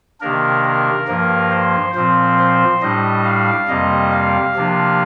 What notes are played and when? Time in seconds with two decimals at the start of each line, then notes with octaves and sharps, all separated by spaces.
0.21 C3 D#3 A#3 D4 A#4
0.64 A#4
1.08 G2 F3 A#3 A#4
1.51 C5
1.94 A#2 F3 C4 C5
2.38 C5
2.81 A2 G3 D4 D#5
3.25 F5
3.68 F2 C3 G3 A#3 D#5
4.12 F5
4.55 C3 F3 A#3 D4